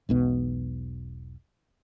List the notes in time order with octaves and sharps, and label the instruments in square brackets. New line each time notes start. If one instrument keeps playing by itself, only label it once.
[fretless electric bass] E1 B1 B2